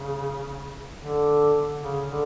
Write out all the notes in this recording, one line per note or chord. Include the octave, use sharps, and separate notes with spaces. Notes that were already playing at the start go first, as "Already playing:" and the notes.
Already playing: C#3
D3
C#3
D3